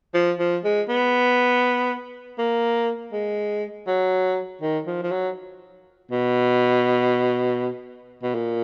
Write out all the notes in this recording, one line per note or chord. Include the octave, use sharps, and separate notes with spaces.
F3
F3
G#3
B3
A#3
G#3
F#3
D#3
F3
F3
F#3
B2
B2
A#2